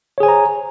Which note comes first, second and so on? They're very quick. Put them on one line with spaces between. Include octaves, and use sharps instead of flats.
C#5 G#4 G#5 C5 A#5